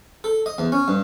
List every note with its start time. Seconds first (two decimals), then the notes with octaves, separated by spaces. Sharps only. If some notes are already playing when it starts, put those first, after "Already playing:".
0.24 A4
0.46 D#5
0.58 E2
0.72 C#4
0.88 G2